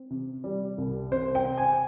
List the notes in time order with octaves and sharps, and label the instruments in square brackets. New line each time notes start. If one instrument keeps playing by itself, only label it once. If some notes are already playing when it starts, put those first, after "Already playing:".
Already playing: [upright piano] C4
C3
G3
C2
C3 C5
G5
C4
G#5